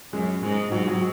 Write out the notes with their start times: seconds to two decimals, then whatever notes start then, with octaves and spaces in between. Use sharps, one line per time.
0.13 F#2 G#3
0.43 G#2 G#3
0.72 G#2 F#3
0.88 F#3